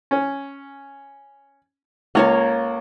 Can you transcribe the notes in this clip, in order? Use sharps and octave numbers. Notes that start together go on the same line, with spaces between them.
C#4
C#2 A#3 C#5 F5